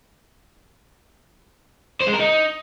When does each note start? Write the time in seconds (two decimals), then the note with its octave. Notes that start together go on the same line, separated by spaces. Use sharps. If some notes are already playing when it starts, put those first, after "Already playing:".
2.02 C5
2.08 G#3
2.14 A#4
2.20 D#4